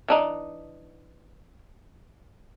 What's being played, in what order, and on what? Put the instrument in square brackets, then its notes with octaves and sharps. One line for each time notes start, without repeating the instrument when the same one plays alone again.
[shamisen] E3 D4 D#4